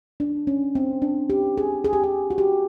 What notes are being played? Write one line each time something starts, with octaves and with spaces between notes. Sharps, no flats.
D4
C#4
C4
D4
G4
G#4
G#4
G4
G#4
F#4
G4